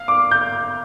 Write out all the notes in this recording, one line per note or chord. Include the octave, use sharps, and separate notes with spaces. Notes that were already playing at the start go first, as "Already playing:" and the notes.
Already playing: F5
D6
G6